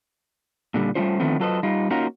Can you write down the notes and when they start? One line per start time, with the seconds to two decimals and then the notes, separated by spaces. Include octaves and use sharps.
0.74 A#2 D3 G3
0.95 G3 A3 A#3 C#4 F4 C5
1.20 D3 D#3 F3 A3 B3 C4
1.40 F#3 F4 A4 B4 C5 D#5
1.63 G3 D#4 F4
1.90 A#3 C#4 D#4 F4 F#4 A#4